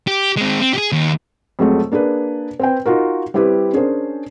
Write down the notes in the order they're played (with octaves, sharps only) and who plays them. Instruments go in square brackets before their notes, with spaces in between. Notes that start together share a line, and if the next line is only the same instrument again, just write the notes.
[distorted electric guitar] G4
G#3 C4
C4
G4 G#4
D#2
[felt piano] F2 F#3 G#3 A3
A#3 D4 G#4 B4
C4 B4 G5
D#4 F4 F#4 A#4
G3 C4 E4 G4 B4
C#4 D4 G#4 A#4 C5